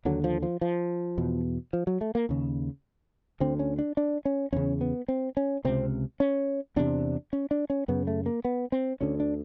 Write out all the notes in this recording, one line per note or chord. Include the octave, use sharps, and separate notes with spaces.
D#2 D3 F#3
F3
F3
F3
E2 B2
F3
F#3
A3
A#3
D#2 C#3
D2 D3 C4
C#4
D4
D4
C#4
E2 C#3 C#4
B3
C4
C#4
C#2 C3 C4
C#4
E2 C3 D4
C#4
D4
C#4
F#2 C#3 B3
A3
A#3
B3
C4
D2 D3 C#4
D4